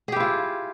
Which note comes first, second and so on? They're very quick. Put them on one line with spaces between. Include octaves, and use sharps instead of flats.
G#4 G4 E4 F4